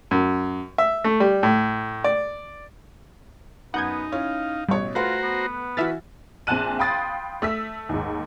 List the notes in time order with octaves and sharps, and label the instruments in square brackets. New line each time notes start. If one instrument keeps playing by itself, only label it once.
[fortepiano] F#2
E5
A3
G3
A2
D5
[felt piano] F#2 [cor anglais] B3 [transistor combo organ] D#4 [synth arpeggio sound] F#5 G6 G#6
[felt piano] C#4 E4 [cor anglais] F5
[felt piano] A1 B2 C#5 [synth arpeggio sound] G3
[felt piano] A3 B4 F#5 [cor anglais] F4 [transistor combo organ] F#4 C5 A#5
[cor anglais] B3
[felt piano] E3 E4 F#4 [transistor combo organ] B4 [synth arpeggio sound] E5 F6 A6
[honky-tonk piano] A#1 C4 G#5 A5 F#6 D#7
F5 G5 B5 C6 D#6 A6
A3 E6 B6
D#2 G#2